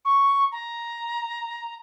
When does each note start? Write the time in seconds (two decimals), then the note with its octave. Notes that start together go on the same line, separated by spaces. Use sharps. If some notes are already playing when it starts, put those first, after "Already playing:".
0.05 C#6
0.52 A#5